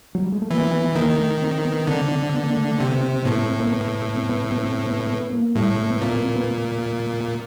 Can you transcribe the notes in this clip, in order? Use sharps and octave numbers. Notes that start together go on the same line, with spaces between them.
F#3
G3
G#3
A3
E3 A#3
B3
B3
B3
D#3 A#3
A3
C4
B3
D3 C4
C4
B3
A#3
A3
A3
C3 C4
B3
C4
C4
A2 B3
B3
C4
A#3
B3
C4
B3
B3
C4
B3
B3
A#3
A2 G3
G#3
A3
B3
A#2 C4
B3
C4
B3